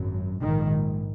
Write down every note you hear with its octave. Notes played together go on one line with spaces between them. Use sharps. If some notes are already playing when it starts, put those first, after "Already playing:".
Already playing: G#1 F#2
A#1 G#2 D#3